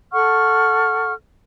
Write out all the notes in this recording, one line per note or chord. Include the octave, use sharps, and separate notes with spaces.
A4 F#5 C#6 F6